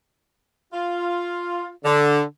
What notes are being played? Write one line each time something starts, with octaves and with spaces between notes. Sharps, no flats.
F4
D3